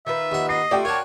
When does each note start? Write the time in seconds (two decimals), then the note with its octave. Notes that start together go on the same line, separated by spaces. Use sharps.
0.06 D#3 F4 B4 E5
0.32 D#2 F#5
0.49 D#5 C7
0.71 A3 F4 G4 D5 F#5 G5
0.85 F4 F#4 A#4 C#5 A5